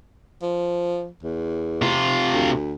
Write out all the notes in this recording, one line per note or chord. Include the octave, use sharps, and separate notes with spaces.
F3
E2
C3 F4
D2